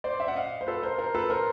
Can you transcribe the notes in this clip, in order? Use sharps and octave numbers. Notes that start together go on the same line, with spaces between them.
C5 D5
D5 E5
F#5
D#5 F5
C5
A4 B4
A#4 C5
A#4 C5
A4 B4
A#4 C5